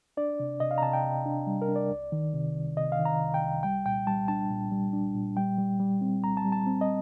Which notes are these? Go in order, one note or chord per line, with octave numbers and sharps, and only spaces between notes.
D4 D5
C3
C3 D#5
F5
A#5
C3 A5
G5
C3
D4
G3
A#4
D4
D5
C2
D#3
C3
C2
C3 D#5
F5
D#3
A#5
C2
G5
C2
G3 G5
A#2 G5
G3 A5
D4 A5
A#2
G3
D4
A#2
G3 G5
G3
G3
C4
C2 A#5
A5
G3
A5
C4
D#5